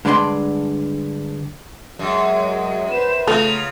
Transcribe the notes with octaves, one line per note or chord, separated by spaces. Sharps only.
G2 D3 G#3 D5 A#5 C6
F#2 F#3 G#3
B4 C5 E7
C#3 A3 B3 F4 A#5 F7